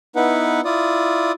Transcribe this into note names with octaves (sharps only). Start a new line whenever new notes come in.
B3 D#4 E4 B4 F#5
E4 F4 D5 D#6